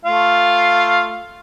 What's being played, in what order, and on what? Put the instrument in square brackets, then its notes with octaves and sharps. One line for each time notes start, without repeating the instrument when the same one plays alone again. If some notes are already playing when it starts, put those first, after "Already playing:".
[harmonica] A3 F4 F5